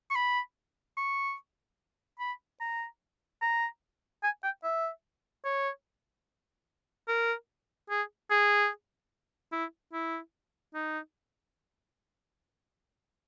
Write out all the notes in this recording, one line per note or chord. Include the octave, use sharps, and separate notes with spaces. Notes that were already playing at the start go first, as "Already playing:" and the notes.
C#6
B5
C#6
B5
A#5
A#5
G#5
G5
E5
C#5
A#4
G#4
G#4
E4
E4
D#4